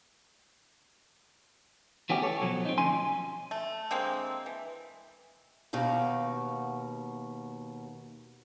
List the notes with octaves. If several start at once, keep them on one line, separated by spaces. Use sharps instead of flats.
E3 A3 B3 C#4 F#4 G4
A4 C#5
B2 F3 F#3
C4 D#4
D2 F3 C#4 G#5 C6
A3
D3 G#3 A#3 C4
E3
D#2 B2 F#4 F5